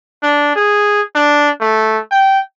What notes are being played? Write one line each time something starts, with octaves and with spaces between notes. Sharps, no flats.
D4
G#4
D4
A3
G5